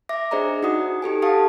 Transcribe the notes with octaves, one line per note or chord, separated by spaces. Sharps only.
E5 D6 A#6
D4 G#4 C5 D5 D#5 A#5
D#4 F#4 F#5 D#6
D#4 G4 A4 G#5
G4 A4 F5 F#5 A5 D#6